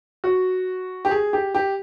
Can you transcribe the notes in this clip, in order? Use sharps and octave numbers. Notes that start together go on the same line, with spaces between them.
F#4
G4
G#4
G4
G4